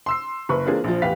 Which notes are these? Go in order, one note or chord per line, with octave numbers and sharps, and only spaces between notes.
C6 E6 C7
F#1 B4 C#6
E3 A#3 C4 D4 F4 G#4
A#1 F3
A1 E2 G4 B4 F5 B6